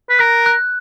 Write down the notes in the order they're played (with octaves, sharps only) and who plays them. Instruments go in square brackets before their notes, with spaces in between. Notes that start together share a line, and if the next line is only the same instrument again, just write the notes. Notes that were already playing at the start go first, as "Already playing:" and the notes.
[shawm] B4
[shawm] A#4 [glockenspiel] F#6
[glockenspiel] F#6